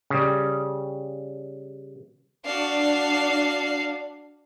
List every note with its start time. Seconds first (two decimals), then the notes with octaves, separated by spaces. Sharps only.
0.10 C#3 G3
2.45 D4 F#4 F5